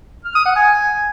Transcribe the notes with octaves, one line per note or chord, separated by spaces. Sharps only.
F6
D#6
F#5
G#5